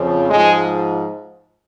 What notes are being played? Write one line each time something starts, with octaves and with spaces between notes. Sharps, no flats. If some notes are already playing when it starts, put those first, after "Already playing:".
Already playing: F2 C#3 F3
G#2 F3 G#3